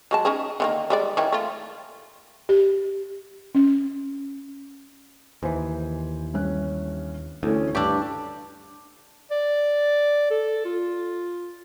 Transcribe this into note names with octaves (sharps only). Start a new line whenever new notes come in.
F#3 G#3 A5
C#4 D#4 G#4
D3 D#3 A#3
G3 G#3 D5
D#3 E3 C#4
A3 F4
G4
C#4
D#2 E3 C5 G#5
G2 C#4 F#6
D2 E3 A3 C#4
G2 D4 G4 C#6 D6 E6
D5
A4
F4